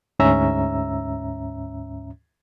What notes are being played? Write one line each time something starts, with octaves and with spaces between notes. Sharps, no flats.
D2 G#2 C#4 E5 A#5 E6